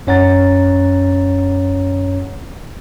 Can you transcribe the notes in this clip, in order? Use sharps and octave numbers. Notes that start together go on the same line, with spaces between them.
F#2 C#4 C#5 F#5 A#5 A6